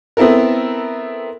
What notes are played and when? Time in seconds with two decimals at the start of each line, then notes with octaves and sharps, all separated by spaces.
0.17 B3 C4 E4 A4 A#4